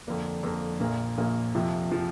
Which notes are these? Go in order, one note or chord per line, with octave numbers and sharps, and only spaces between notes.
F2 D3 A#3 D4
F2 D3 A#3 D4
A#1 A#2 A#3
A#1 A#2 A#3
F2 C3 F3
C3 F3